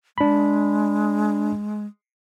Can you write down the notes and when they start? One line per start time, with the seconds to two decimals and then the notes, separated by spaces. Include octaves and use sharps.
0.18 G#3 D4 B5